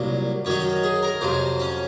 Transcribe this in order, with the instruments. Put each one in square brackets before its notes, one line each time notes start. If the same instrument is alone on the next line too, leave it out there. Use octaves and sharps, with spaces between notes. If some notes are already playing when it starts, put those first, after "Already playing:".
Already playing: [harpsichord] C2 A#2 F#3
F#2 D#3 F#3 C#5
G#4
A#4
F2 C3 F#3 C5
C#4